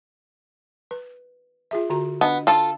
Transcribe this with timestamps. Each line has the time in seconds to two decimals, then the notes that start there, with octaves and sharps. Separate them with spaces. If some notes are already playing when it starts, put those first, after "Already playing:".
0.91 B4
1.71 F4 G#4 E5
1.90 D3 F#4 A#5
2.21 B3 D4 D#5
2.47 F4 A4